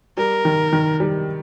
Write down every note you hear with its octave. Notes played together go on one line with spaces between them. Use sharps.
G3 A#4
D#3
D#3
G3